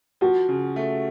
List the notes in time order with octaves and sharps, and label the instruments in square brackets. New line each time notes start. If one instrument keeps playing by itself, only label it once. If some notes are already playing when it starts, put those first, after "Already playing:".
[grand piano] F3 [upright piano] F#4
[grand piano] C#3
A3